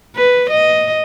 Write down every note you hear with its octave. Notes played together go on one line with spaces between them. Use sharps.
B4
D#5